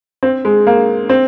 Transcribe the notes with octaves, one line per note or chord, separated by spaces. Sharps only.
C4
G#3
A#3
C4